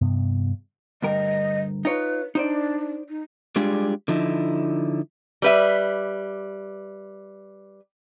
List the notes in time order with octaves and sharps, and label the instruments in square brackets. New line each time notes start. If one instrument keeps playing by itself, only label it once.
[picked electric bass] G2 C3 B3
[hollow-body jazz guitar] D2 G2 A#4 [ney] D#5
[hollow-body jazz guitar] D#4 F4 C#5 [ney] B4
[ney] D4 [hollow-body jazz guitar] D#4 C5 D5
[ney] D#4
[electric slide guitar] G3 G#3 D4 F4 G4 G#4
D3 F3 D#4 E4
[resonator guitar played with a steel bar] G3 B4 E5